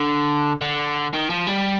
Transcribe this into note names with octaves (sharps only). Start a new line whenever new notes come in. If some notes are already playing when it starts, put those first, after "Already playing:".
Already playing: D3
D3
D#3
F3
G3